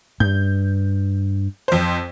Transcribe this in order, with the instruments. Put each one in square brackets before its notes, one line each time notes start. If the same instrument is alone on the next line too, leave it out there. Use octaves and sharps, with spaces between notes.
[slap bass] G2 [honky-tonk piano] G6
[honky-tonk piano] F2 C5